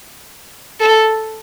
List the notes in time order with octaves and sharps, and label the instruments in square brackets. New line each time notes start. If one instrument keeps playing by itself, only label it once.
[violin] A4